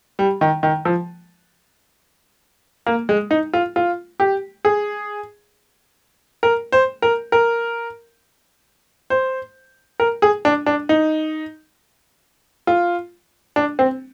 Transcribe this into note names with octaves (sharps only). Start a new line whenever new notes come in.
G3
D#3
D#3
F3
A#3
G#3
D#4
F4
F4
G4
G#4
A#4
C5
A#4
A#4
C5
A#4
G#4
D4
D4
D#4
F4
D4
C4